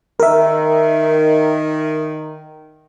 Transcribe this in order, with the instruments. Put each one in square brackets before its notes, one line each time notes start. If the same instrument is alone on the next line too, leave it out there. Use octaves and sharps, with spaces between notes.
[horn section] D#3 [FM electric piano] A#4 E5